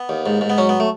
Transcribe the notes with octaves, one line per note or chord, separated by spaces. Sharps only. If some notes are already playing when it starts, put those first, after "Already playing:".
Already playing: B3
D#2
G#2
G#2
B3
F#3 C#4
B3
A3